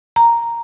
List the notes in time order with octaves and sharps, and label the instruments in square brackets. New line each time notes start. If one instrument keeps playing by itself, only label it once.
[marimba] A#5